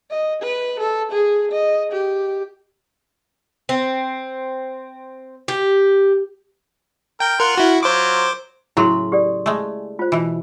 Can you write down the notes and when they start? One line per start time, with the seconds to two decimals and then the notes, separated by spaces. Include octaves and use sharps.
0.11 D#5
0.42 B4
0.80 A4
1.11 G#4
1.52 D#5
1.92 G4
3.69 C4
5.48 G4
7.20 A#4 G5 G6
7.40 F4 A#4 F#5 C6
7.58 E4 F#4
7.83 F#3 F4 C5 D6
8.77 A2 C#3 F#3 E4 G#4 C6
9.12 G4 A4 D5
9.46 G#3 A3
9.99 F4 C5
10.12 B2 E3